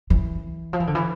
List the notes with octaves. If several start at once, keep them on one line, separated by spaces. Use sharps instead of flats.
E3
F3
E3
D3
E3